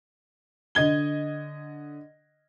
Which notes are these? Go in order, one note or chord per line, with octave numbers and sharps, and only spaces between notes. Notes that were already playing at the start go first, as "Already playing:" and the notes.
D3 D#5 G#6 G7